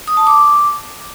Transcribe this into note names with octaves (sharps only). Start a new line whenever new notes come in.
D#6
A5
D6